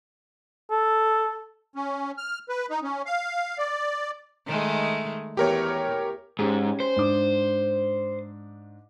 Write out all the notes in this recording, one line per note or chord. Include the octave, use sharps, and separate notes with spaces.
A4
C#4
F6
B4
D#4
C#4
F5
D5
D#3 G#3 A3
E2 G4 A#4 C#5
G#2 C#4 G4 G#4
C5
G#2 D4 D6